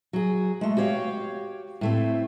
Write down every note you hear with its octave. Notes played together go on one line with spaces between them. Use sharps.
F#3 G#4
G#3 A3
F#4 G4 C#5 E5 F5
A2 A3 C4